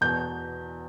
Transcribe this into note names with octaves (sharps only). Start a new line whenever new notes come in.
E2 B2 G6